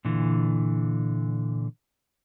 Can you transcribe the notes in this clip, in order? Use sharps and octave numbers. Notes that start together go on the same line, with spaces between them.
A#2 D3 E3